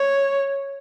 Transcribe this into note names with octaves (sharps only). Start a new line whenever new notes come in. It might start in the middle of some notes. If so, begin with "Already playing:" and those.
Already playing: C#5